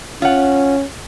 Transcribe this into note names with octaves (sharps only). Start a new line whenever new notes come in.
C#4 F4 F#5